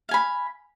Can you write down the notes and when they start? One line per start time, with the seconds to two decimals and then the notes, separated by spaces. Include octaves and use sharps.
0.09 F5
0.11 G#5
0.14 B5